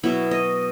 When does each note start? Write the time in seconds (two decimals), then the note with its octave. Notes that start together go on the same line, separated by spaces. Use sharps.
0.04 B2 F#3 B3 E4
0.31 D#5